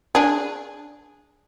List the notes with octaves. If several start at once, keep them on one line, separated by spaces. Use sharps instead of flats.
D4 G#4